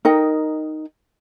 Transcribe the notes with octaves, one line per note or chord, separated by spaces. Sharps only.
D#4 A#4 D#5 G5